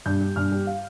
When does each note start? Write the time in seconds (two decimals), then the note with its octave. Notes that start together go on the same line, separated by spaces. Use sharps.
0.06 G2 G6
0.21 G3
0.36 G2 F6
0.52 G3
0.67 F5